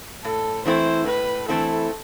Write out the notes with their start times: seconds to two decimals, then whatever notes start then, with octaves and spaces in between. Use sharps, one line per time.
0.24 A2 A4
0.66 E3 A3 C4 E4 C5
1.06 A2 B4
1.48 E3 A3 C4 E4 A4